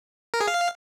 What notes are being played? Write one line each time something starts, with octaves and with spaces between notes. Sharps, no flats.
A#4
G#4
F5